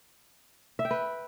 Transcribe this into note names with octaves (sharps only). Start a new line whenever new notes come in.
E5
G5
B4